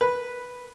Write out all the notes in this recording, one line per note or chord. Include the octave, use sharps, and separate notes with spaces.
B4